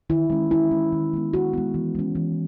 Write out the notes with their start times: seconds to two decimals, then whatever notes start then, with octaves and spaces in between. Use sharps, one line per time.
0.10 D#3 E4
0.30 G#3 C#4
0.51 D#3 E4
0.71 G#3 C#4
0.92 D#3
1.13 G#3 B3
1.33 D#3 F#4
1.53 G#3 B3
1.74 E3
1.95 G#3 C#4
2.15 E3